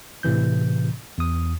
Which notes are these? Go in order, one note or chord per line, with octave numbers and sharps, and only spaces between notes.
A2 C3 E3 G6
E2 D#6